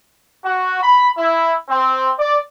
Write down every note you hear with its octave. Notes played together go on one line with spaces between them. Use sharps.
F#4
B5
E4
C4
D5